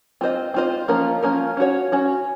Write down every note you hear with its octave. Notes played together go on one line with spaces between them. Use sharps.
C4 F4 C5 D#5
C4 F4 C5 D#5
F3 A#3 C#4 F4 A#4
F3 A#3 C#4 F4 A#4
C#4 F#4 C#5
C#4 F#4 C#5